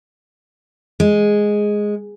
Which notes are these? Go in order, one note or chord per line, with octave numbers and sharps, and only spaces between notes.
G#3